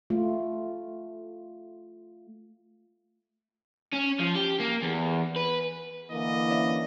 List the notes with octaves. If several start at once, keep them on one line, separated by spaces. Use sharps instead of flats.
A3 F4
C#4
F3
G4
A#3
E2
B4
D3 E3 A#3 D#5
C#4 D5 E5